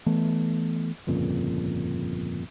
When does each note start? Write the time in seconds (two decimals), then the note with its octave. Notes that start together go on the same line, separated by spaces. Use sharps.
0.06 E3 A3 B3
1.07 G1 F2 A#2 C#3